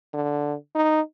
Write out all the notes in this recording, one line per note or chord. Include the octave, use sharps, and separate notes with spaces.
D3
D#4